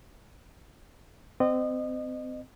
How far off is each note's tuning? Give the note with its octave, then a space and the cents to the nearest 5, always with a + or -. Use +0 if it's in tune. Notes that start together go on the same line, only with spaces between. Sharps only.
C4 -30 D#5 -30